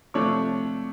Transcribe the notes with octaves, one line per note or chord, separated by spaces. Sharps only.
C3 F3 A3 D4 C#5 C#6